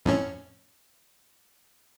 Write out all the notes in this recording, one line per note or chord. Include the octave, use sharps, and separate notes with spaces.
F2 A2 C#4